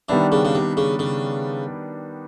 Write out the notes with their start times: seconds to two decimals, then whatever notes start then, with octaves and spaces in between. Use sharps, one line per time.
0.09 D#3 E3 G3 B3 D4
0.32 C#3
0.45 C#3
0.55 C3
0.77 C#3
0.99 C#3